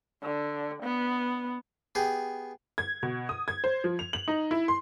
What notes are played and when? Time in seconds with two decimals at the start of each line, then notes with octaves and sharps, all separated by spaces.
0.23 D3
0.83 B3
1.95 B3 G4 G#4
2.78 G#6
3.03 B2
3.29 D#6
3.48 G#6
3.64 C5
3.84 F3
3.99 F7
4.13 F#7
4.28 D#4
4.51 E4
4.68 C6